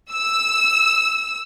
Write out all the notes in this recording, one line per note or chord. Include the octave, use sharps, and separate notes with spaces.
E6